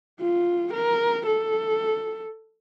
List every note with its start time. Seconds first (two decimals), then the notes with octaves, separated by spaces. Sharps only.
0.20 F4
0.74 A#4
1.27 A4